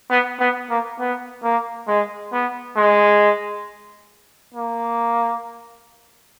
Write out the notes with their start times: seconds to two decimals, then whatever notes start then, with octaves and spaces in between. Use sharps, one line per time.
0.10 B3
0.40 B3
0.70 A#3
0.99 B3
1.43 A#3
1.88 G#3
2.33 B3
2.77 G#3
4.54 A#3